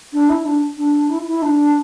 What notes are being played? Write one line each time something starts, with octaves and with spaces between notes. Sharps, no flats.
D4
E4
D4
D4
E4
E4
D4